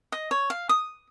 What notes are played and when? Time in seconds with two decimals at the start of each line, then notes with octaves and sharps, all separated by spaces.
0.12 D#5
0.31 C#5
0.50 F5
0.69 D#6